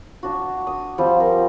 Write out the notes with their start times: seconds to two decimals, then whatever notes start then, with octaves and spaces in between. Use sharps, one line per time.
0.23 D4 F#4
0.67 D#6
0.98 F3 G3 C4
1.20 A#4